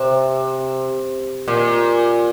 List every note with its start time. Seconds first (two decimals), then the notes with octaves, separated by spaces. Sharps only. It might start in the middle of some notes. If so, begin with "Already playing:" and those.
Already playing: C3
1.48 A#2